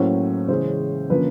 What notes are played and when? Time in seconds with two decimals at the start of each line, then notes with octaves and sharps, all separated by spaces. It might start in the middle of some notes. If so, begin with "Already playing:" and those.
Already playing: A2 F#3 A#3 C#4 C5
0.48 C#3 E3 G#3 C#4 C5
1.09 D3 F3 A#3 C#4 B4